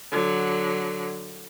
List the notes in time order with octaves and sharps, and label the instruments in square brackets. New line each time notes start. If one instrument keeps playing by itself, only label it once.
[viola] D3 F#3